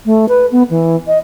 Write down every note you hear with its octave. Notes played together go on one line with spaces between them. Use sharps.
A3
B4
B3
E3
D#5